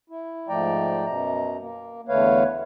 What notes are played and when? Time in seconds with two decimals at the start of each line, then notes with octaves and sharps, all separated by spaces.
0.10 E4
0.48 G#2 F3 A3 D5 G5 A#5
1.05 F#2 B2 A#5
1.60 A#3
2.09 E2 D3 A3 B4 C#5 F5